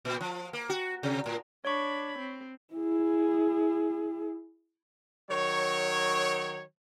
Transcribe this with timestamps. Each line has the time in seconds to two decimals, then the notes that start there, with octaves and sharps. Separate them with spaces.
0.05 A#2
0.21 F3
0.53 A#3
0.70 F#4
1.03 C3
1.26 A2
1.65 D4 C#5 B5 C#6
2.18 C4
2.74 E4 G#4
5.30 D#3 F#3 C#5